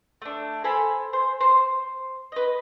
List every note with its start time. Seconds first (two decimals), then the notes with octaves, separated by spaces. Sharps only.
0.22 A3 D4
0.64 A4 C5 G#5 B5
1.13 C5
1.41 C5
2.32 B4 D#5